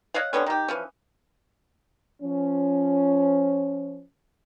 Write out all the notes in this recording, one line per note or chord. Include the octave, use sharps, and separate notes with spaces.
C#5 D#5 F5 F#5
D3 G3 B3 C#4
D#3 G4
E3 F3 C#4
F3 C#4